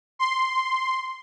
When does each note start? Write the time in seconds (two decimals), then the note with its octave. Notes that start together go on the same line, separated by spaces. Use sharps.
0.19 C6